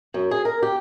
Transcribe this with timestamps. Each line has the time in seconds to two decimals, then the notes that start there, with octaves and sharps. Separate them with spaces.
0.14 F#2
0.31 G#4
0.45 A#4
0.63 G4